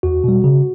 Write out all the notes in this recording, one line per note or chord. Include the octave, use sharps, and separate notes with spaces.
E2 F#4
B2 G3
C#3